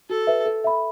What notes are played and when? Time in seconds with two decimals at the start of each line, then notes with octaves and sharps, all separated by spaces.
0.09 F#4 A4
0.27 B4 E5
0.46 A4
0.64 E5 B5